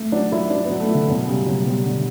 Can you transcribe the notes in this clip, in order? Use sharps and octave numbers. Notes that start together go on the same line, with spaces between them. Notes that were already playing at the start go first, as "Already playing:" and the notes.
Already playing: A3
F#3 D4
F#3 E4
F#3 D4
F#3 B3
A3
E4
D3
F#2 B2
C#3 G3
F#2 B2
B2 G3
D3